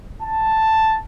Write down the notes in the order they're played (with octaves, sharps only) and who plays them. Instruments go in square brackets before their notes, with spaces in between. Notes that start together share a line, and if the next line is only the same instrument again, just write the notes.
[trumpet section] A5